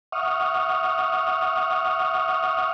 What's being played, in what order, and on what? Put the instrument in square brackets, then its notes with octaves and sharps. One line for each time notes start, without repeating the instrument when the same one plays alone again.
[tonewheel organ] E5 F#5 C#6 D#6 F6